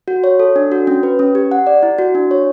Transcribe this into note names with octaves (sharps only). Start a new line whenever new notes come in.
F#4
C#5
A4
D4
F#4
C#4
B4
C#4
G4
F#5
D5
E4
F#4
D4
C#5